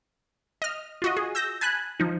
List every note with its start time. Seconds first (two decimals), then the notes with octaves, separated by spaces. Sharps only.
0.62 D#5 F6
1.02 F4 F#4 D#5
1.17 G#4
1.35 E6 G6 A#6
1.61 G#5 A5 B5 F#6
2.00 F3 D#4